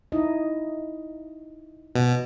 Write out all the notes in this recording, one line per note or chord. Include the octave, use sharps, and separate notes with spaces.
D#4 E4 D#5
B2